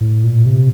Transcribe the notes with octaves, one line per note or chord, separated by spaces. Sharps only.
A2
A#2
C3